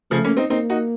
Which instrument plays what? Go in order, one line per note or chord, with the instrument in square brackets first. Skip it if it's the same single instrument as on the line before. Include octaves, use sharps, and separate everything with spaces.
[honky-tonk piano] C#3 F3 [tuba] A3
[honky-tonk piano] A#3 C#4
C4 D#4
[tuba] A#3 [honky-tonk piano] C4 D#4
[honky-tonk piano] D#4 F#4